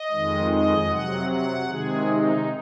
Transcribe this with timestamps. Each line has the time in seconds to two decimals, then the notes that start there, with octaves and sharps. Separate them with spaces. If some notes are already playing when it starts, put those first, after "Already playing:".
Already playing: D#5
0.11 F2 D#3 G#3
0.51 D#5
0.90 C3 F#3 F#5
1.29 F#5
1.68 C3 D#3 G#3 G#4
2.08 D#4